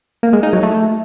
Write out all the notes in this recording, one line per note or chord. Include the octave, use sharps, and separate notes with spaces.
A#3
G#3
D#4
F#3
A3